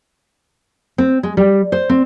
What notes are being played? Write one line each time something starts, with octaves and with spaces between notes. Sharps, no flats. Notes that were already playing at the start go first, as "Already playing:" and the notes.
C4
G#3
G3
C5
C4